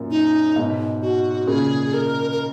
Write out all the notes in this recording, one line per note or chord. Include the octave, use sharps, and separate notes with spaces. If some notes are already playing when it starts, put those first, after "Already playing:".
Already playing: F#2 A#2
D#4
G#2 B2
F#4
A#2 C#3 G#4
A#4
A#4